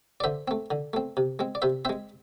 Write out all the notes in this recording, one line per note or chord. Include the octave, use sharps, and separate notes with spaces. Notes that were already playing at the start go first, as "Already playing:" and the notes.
D5
D3 C5 E5
A3 C4
D3
A3 C4
C3
G#3 C4
D5
C3 C5 E5
G#3 C4 C5 E5